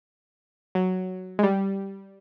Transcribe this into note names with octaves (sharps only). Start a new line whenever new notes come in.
F#3
G#3
G3